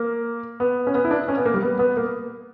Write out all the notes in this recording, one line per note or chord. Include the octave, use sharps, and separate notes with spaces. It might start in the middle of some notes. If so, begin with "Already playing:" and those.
Already playing: A#3
B3
C#4
B3
E4
D4
C#4
B3
A#3
G3
B3
B3
A#3